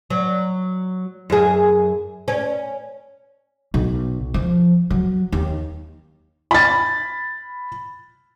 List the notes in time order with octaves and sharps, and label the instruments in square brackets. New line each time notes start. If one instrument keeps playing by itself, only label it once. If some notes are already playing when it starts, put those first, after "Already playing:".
[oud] F#3
F#2 G#4
C#4
[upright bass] B1
F3
F#3
D#2
[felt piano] B5 A6